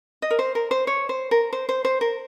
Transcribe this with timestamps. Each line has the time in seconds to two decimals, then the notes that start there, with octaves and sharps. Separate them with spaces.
0.22 D#5
0.31 A#4
0.39 C5
0.55 A#4
0.71 C5
0.87 C#5
1.09 C5
1.31 A#4
1.53 C5
1.69 C5
1.85 C5
2.01 A#4